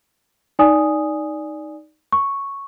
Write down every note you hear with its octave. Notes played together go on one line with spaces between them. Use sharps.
D#4 D5 G#5 D#6
C#6